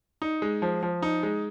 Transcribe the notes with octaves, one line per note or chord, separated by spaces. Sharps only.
D#4
G#3
F3
F3
D#4
G#3